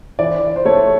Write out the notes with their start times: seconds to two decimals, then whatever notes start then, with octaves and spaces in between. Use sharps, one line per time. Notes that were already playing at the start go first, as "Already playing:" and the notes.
0.19 E3 D5
0.56 C5
0.65 A3 C#5